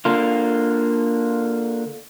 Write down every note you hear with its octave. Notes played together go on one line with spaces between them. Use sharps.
D3 A#3 F4